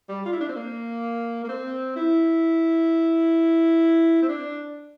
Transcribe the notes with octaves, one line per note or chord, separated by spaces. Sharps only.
G3
F4
E4
D4
C4
A#3
A#3
C4
E4
C4
D4